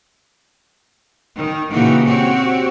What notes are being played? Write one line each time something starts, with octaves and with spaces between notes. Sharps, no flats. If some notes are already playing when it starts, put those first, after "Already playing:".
D#3
A#2 C#3 E3 D#4 F#4 G4
C4 F#4 G4 C#5